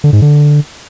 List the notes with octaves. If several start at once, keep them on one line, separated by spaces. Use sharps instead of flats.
D3
G#2
D3